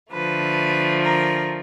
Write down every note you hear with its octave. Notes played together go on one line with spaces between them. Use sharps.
D3 F3 A3 B4
A#4